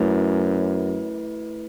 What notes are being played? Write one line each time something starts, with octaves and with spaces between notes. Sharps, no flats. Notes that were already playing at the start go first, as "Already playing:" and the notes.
Already playing: F#2 A3 E4 B4